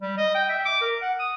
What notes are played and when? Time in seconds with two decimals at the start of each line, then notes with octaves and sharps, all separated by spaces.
0.02 G3
0.17 D#5
0.35 G5
0.49 E5
0.65 D6
0.81 A#4
1.02 F#5
1.20 D#6